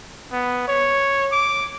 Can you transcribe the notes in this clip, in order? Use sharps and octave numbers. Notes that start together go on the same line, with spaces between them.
B3
C#5
D6